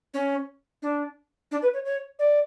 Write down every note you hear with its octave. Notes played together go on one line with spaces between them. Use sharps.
C#4
D4
D4
B4
C#5
C#5
D5